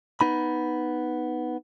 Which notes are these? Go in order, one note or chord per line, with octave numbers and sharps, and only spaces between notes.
B3 D#4 B5